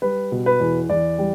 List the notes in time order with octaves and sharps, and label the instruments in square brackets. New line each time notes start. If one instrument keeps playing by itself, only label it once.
[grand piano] G3 B4
B2
B4
E2
E2 D5
G3